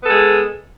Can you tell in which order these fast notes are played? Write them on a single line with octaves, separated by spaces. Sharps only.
B3 A4 G#3 G#4